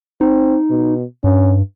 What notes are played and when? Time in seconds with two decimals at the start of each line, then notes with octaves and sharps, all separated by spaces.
0.21 C4 D#4
0.70 B2
1.24 G2 C#4